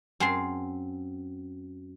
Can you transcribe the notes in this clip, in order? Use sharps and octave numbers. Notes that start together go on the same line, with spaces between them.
F#2 C4 G#4 A5 C6